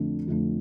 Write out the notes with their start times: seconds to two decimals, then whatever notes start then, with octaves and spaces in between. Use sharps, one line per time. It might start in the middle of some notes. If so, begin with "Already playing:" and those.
Already playing: F2 D3 A3 D4
0.28 F2 D3 A3 D4